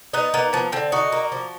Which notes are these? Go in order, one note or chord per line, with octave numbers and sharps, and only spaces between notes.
B3 D#4
A#3 B3
F3 B3
D3 C4
D#4 F#4
A#3
F3